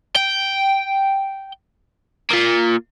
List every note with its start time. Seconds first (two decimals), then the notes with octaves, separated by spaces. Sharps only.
0.16 G5
2.31 A#3 F4